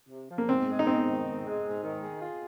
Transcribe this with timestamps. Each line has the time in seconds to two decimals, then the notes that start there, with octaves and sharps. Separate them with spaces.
0.09 C3
0.29 F3
0.38 A#3
0.49 G#2 C4
0.68 G#3
0.79 D#4
0.87 G#2 C4
1.06 D#3
1.26 G#2
1.45 G#3
1.64 G#2
1.83 D#3
2.02 G#4
2.22 F4